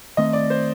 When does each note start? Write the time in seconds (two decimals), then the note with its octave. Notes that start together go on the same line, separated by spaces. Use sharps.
0.17 D#3 A3 C4 D#5
0.33 D5
0.50 C5